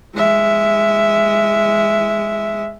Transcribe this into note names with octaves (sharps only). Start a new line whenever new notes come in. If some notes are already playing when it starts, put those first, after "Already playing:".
G#3 E5